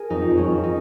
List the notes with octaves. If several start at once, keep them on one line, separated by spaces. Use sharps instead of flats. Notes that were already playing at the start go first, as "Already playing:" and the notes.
Already playing: G#4 A#4
F2 D#4
F2
C#4
F2
D#4